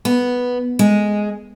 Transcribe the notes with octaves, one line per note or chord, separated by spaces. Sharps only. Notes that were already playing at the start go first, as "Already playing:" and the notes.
B3
G#3